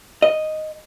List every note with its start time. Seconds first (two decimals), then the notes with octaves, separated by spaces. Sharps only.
0.22 D#5